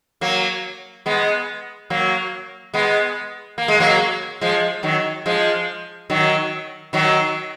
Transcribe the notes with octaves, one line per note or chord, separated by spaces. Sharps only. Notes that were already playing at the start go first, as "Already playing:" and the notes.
F#3 A#3
G#3 B3
F#3 A#3
G#3 B3
A#3
G#3
F#3 A#3
F3 G#3
D#3 F#3
F3 G#3
D#3 F#3
D#3 F#3